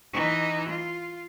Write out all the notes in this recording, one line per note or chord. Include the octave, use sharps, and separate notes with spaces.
E3 D#4
F4